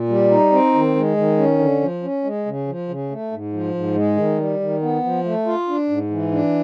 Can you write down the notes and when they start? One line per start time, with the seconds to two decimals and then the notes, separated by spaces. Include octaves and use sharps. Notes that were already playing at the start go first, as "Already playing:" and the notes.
Already playing: A#2
0.09 G3
0.31 D#4
0.52 C4
0.74 D#3
0.96 G#3
1.17 D#3
1.37 C#4
1.59 D3
1.81 F3
2.03 C#4
2.24 G#3
2.46 C#3
2.67 F3
2.89 C#3
3.10 A3
3.32 G#2
3.53 F3
3.74 G#2
3.95 G#3
4.17 D#3
4.38 G3
4.60 D#3
4.82 B3
5.04 F3
5.24 A3
5.46 F4
5.68 D4
5.89 G#2
6.10 E3
6.32 D4